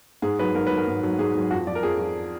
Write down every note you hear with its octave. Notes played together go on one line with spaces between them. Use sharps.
G#2 G#4
D#3 F#3 B4
G#2 A#4
D#3 F#3 B4
A#4
G#2
D#3 F#3
G#2 G#4
D#3 F#3
F2 F#4
F3 D5
A#4
F2 G#4
F3